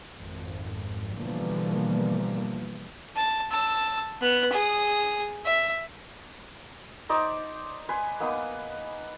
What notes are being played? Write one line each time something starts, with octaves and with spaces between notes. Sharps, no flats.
G#1 F2
B2 D3 E3 F3 G3 A#3
A5
A5 E6
B3 F#6
G#4 D#6
E5
D#4 C5 D5
B4 G#5 C6
A#3 B3 D#4 B4